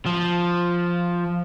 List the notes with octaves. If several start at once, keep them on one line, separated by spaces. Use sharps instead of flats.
F3